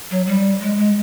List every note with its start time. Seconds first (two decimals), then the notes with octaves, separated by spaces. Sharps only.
0.10 F#3
0.27 G3
0.61 G#3
0.78 G#3